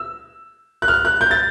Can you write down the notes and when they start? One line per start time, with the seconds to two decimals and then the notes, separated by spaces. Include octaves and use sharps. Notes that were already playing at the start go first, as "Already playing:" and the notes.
Already playing: E6
0.82 F#6
0.88 F6
1.05 F#6
1.21 G6
1.31 A6